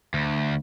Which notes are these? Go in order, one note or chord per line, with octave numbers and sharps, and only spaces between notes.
D2